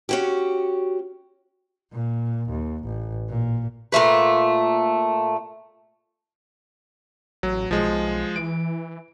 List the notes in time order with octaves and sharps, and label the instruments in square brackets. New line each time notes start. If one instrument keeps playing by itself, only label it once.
[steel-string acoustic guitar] C#4 F#4 G4
[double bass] A#2
D#2
A1
A#2
[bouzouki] A#2 F#3 A3 B4
[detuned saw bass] A1 [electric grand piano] F#3
[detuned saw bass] B1 [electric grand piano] F3 G#3
[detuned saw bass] E3 [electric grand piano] D7